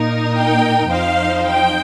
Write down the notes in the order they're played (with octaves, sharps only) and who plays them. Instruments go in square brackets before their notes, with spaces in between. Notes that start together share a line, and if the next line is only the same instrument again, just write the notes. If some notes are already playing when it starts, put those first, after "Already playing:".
Already playing: [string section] A#2 A#3 D#4 A#4
[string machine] G5
[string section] F2 F3 D#4 C5 [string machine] F5
[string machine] G5